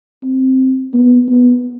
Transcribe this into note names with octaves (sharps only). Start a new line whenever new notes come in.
C4
B3
B3